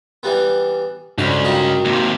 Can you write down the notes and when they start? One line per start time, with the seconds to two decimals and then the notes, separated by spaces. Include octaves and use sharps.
0.23 E3 G3 B3
1.18 C#2 G2 F#4 A4 C5 D5
1.45 D#4 F4 F#4 A#4 D#5 G5
1.85 D#2 C3